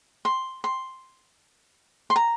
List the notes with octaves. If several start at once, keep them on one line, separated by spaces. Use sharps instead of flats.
C6
C6
C6
A#5